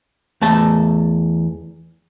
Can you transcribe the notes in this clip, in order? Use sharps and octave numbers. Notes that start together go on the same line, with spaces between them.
E2 A3 A5